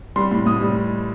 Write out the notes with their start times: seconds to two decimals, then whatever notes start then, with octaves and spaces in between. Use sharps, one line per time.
0.16 G3 C6
0.31 A2
0.46 A2 D#6
0.61 G3